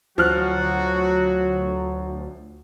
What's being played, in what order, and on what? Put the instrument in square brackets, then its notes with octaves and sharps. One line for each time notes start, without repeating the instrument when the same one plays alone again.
[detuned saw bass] D2 [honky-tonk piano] F3 F6 F#6 [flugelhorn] F#3 [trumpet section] F#4